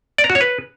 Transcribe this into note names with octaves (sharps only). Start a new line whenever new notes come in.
D5
A#5
F#4
C#5
B4